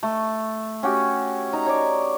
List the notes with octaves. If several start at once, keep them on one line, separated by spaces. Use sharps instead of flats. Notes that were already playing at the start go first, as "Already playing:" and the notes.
A3
C#4 F#4 G4
D#4 A#5
C#5 D5